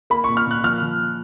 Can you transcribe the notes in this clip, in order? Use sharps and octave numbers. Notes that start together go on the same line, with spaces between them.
A#3 B5
C#6
A#2
F6
A#2 F#6
F3 F6
F3